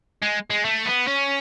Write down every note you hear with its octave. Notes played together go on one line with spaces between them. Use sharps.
G#3
G#3
A3
B3
C#4